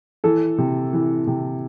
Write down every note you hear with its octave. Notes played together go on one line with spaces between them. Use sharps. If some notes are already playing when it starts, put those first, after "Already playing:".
E3 A4
C3
E3
C3